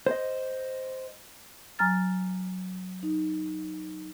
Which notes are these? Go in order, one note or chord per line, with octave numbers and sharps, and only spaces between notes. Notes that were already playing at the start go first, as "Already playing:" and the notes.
C5 D#5
F#3 G#5 A#5 F6 A6
D#4